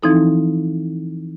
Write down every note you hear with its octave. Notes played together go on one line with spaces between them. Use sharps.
E3 F3 C4 D#4 E4 A4